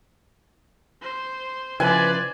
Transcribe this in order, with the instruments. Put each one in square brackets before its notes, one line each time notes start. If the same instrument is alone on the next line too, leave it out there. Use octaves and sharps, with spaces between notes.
[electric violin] C5
[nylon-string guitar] C#3 F3 E4 [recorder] B4 [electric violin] C5 D5 [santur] G#5